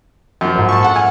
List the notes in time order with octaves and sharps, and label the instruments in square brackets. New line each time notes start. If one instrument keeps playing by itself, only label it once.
[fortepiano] F#2 F3
[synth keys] A#1 G#2
A5 C#6
A4 F#5
[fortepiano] G#5 [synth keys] F6